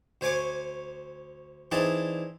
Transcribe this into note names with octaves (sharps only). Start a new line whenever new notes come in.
D2 C5 C#5 G#5 C#6 D6
E3 C4 D4 D#4 G#4 D5